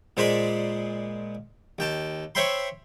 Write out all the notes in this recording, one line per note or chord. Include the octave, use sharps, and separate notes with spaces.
A#2 G#3 C5 D5 B5
D#2 G5 A5
C5 C#5 E5 G5 B5 C6